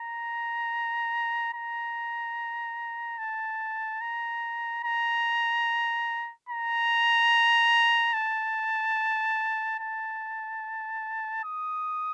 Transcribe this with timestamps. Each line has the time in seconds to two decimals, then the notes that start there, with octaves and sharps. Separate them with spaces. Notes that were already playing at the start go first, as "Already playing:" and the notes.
Already playing: A#5
1.54 A#5
3.18 A5
4.01 A#5
4.84 A#5
6.49 A#5
8.14 A5
9.79 A5
11.44 D#6